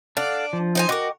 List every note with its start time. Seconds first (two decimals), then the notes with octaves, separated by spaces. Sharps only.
0.17 D4 A4 F5 F#5
0.53 F3
0.75 D#4 C5 G#5
0.89 F#4 A#4 D#5 G5 D6